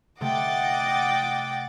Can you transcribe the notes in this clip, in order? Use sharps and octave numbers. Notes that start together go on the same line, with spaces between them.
C3 A3 D#5 F#5 G5 D6 A6